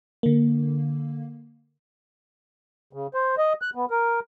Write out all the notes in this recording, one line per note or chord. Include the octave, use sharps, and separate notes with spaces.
D3 A#3
C#3
C5
D#5
F#6
B3
A#4